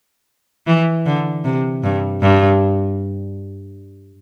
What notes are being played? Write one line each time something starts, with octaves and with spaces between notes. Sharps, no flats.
E3
D3
C3
G2
G2